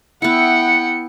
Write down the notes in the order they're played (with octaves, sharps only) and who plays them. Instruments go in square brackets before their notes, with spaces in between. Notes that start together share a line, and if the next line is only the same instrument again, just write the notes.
[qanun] B3 E4 [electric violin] F#5 G5 [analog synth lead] C#7